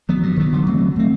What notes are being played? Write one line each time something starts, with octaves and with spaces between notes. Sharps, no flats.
D#3 F#3 B3
G2
D#3 F#3 B3
D3
F#3 A3 C4
D3
F#3 A3 C4